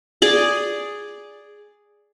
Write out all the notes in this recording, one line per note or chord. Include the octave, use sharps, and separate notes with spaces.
G#4 D5